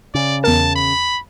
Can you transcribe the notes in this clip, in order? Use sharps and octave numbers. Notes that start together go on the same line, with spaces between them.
C#3 D5
E2 A#4 A5
B5